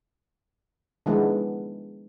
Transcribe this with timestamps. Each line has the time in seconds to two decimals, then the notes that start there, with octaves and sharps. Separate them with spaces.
1.06 D#3 F3 G#3 B3 D4 E4